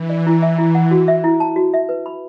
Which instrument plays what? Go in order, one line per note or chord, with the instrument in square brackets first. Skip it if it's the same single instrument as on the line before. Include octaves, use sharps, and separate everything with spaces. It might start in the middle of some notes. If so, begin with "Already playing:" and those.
Already playing: [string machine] E3 [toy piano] D4
[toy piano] D5
E4
E5
[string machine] E3 [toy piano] E4
[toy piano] F#5
F#4
E5
E4
A5
F#4
E5
B4
B5